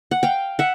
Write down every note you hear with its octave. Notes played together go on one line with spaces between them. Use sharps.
F#5
F5 G5
E5 F#5